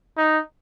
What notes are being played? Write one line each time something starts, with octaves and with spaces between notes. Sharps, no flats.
D#4